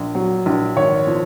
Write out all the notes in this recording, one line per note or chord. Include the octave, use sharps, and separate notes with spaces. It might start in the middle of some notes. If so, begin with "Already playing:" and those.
Already playing: A#1
F#3
A#1
G#1 C#5
F3